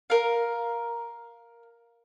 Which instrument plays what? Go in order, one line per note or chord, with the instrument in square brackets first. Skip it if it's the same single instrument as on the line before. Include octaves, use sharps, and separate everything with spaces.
[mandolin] A#4 F5